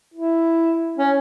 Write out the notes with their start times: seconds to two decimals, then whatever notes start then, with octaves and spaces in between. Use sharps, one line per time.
0.14 E4
0.98 C#4